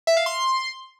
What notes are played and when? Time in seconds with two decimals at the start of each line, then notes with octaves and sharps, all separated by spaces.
0.07 E5
0.17 F5
0.26 C6